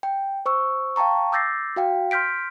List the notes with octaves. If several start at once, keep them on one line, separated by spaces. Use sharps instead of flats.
G5
C5 C#6 E6
F5 G5 A5 A#5 C#6
D6 E6 G6 A6 A#6 C7
F#4 F5 G5
C6 F6 G6 B6 D7